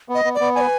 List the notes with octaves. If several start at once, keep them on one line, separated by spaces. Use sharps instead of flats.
B3
D#5
B3
D5
B3
D5 G#5
B4